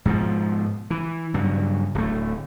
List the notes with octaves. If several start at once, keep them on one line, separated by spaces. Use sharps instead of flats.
G#2 B2 E3 F3
E3
G2 C#3 F#3
D1 A3